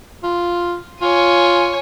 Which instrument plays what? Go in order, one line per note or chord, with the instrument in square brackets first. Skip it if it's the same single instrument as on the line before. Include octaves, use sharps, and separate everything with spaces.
[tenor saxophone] F4
[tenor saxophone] F4 [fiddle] C#5 G#5